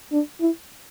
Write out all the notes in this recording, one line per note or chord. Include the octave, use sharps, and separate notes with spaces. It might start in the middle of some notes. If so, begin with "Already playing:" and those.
D4
E4